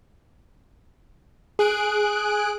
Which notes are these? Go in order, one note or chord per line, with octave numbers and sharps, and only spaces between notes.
G#4 F#6 D7